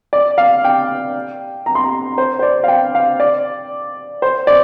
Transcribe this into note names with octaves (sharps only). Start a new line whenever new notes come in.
D5
F5
G5
A#5
C6
A#5
C5
C5
D5
F5
G5
F5
D5
C5
D5